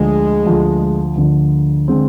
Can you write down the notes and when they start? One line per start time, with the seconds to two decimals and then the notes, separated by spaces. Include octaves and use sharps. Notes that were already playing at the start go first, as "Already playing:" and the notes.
Already playing: D2 D3 F3 G#3
0.45 D2 D3 F3
1.16 D2 D3 F3
1.88 D3 G#3 C4